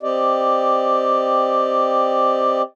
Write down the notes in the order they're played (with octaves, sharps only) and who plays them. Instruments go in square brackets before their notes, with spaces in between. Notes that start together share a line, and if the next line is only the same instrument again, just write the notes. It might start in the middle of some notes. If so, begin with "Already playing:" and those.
[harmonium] C4 G4 D5 D#5